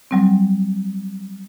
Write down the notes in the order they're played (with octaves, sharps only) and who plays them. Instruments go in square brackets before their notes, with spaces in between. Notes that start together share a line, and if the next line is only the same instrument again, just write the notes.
[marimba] F#3 G3 C4